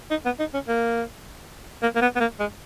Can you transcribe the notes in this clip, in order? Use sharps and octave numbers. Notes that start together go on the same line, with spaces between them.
D#4
B3
D#4
C#4
A#3
A#3
A#3
B3
B3
A#3
G#3